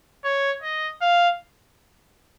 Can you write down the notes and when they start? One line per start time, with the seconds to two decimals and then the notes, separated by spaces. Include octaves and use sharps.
0.24 C#5
0.62 D#5
1.01 F5